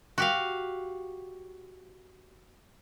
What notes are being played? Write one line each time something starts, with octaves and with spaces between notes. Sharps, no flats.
F#4 G4 F5